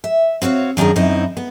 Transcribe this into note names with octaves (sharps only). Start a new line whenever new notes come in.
E5
C4 F#4 C#5 F5
F#2 D#3 D4 G#4 A#5
F#2 C4 D#4 E4
B3